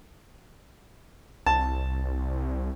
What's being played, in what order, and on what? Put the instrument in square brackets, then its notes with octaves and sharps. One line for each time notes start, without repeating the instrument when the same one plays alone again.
[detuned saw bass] C2 [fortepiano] A5